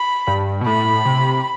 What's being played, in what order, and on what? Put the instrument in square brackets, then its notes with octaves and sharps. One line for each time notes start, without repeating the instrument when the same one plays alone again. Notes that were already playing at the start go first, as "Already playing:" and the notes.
Already playing: [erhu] B5
[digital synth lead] G2
B2
[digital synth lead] A2 [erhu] B5
[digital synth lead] C3